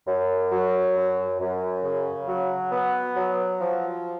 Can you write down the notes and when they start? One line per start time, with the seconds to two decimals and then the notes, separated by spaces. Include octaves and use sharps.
0.06 F#2
0.50 F#3
0.96 F#2
1.39 F#2
1.83 C#3
2.27 F#3
2.71 B3
3.16 F#3
3.60 F3